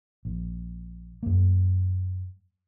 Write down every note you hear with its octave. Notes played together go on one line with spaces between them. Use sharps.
A#1
F#2 A#3